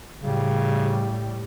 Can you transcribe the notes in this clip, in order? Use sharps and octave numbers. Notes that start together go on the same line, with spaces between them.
A2 C#3 G3